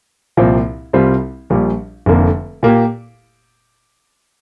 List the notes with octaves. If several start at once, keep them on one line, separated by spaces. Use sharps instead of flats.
C2 A#2 F3 C4
C2 C3 G3 C4 F4
A#1 A#2 G3
F1 F2 D3 A#3
A#2 A#3 G4